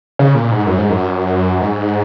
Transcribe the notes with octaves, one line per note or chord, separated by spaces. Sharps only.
C#3
A#2
G#2
F#2
G#2
F#2
G#2